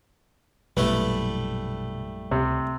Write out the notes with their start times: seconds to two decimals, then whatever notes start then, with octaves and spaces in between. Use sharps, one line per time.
0.77 A#1 F#2 B2 G3 A3 E4 B4
2.31 C#2 C3